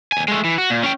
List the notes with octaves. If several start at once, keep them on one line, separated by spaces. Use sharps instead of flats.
D#2 G#5
G#3 A3
E3
F#4
A#2
C#4 G5